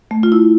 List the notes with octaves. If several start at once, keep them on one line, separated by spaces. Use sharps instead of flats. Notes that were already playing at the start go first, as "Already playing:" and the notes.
A3
F4
E4